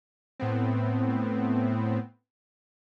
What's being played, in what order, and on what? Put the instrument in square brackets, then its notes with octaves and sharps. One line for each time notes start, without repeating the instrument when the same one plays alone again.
[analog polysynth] A2 B3 C4